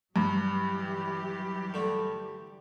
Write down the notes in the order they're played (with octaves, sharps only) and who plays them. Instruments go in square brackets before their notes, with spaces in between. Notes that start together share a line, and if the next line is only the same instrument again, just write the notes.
[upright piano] G2 [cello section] E3 F#3 G4
[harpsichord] D3 A3